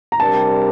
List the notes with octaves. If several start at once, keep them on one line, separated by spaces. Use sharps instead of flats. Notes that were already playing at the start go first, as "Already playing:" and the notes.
A#5
C3 G3 D4 G4 A#4 A5